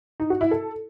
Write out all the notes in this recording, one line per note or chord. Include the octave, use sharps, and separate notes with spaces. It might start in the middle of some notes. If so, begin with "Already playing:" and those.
D#4
F#4
E4
A4